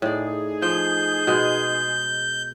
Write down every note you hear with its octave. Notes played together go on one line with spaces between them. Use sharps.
A2 D#4 G#4 D5
F3 G6
B2 G#3